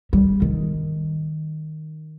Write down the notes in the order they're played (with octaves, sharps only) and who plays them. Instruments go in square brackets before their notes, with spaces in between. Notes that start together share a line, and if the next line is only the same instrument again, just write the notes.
[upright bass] G3
D#3